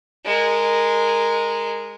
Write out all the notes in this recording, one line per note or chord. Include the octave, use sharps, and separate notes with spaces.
G#3 A#4